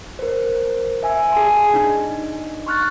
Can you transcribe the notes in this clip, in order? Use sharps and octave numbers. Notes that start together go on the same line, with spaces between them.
A#4 C5
E5 G#5 E6
G#4 G#5 A5 C6
D4 D#4
C6 C#6 F6 F#6 A6